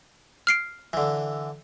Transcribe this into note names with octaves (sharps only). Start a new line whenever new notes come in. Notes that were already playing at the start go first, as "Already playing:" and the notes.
F6 C7 D7
D3 E3